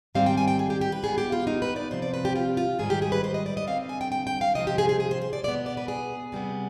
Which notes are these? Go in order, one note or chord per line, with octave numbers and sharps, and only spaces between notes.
G#2 D#3 G3 C4 F5
G5
G#5
G5
G#4
G4
G4
B4
B2 B3 G#4
G4
F4
D#4
B4
D5
C3 F3 C4 C5
D5
B4
G4
F4
F4
G#2 D#3 G3 G#4
G4
G#4
B4
C5
D#5
D5
D#5
D3 G3 C4 F5
G#5
G5
G5
G5
F5
C3 F3 C4 D#5
G4
G#4
G#4
G#4
C5
C5
D5
B2 B3 D5
D5
B4
G#4
C3 G3 B3